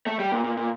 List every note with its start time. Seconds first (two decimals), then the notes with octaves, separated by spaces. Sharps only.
0.07 A3
0.20 G3
0.32 A#2
0.44 A#2
0.57 A#2